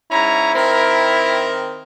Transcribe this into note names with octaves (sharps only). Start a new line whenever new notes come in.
G#2 C#4 E4 A#5
D#3 C4 A#4